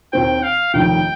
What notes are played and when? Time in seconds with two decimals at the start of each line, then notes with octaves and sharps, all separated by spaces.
0.13 D#2 D#3 C4 G5
0.43 F5
0.74 F1 D#2 D#3 G5